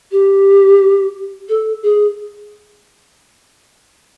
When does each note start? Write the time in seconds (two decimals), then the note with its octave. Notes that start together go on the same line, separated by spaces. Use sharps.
0.12 G4
1.49 A4
1.83 G#4